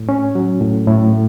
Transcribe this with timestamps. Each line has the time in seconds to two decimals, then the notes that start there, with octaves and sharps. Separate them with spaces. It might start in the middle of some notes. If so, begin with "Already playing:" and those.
Already playing: A2
0.09 C#4
0.35 F#3
0.61 A2
0.88 A2
1.13 A3